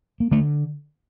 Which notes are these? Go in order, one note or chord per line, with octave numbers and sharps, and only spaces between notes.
A#3
D3 A3